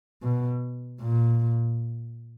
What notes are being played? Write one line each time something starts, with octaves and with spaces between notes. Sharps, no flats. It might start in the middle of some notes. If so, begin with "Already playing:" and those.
B2
A#2